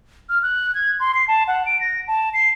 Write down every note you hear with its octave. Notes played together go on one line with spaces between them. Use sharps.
F6
F#6
G#6
C6
C7
A5
F#5
D7
A#6
A5
C7